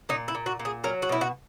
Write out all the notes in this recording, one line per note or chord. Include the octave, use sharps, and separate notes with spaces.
A#2 D#4
E4
A#2
F#4
A#2
G#4
F#3 A#4
F#4
B2 E4
F#4